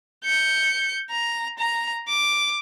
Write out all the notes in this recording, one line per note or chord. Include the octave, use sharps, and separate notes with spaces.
G6 C#7
A#5
A#5
D6